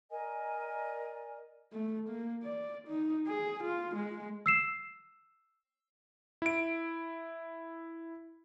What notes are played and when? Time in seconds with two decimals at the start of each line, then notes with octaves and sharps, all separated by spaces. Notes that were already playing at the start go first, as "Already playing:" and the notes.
0.11 A#4 D5 D#5 G#5
1.73 A3
2.09 A#3
2.43 D5
2.88 D#4
3.27 G#4
3.63 F4
3.96 G#3
4.46 E6 C7 E7
6.42 E4 D7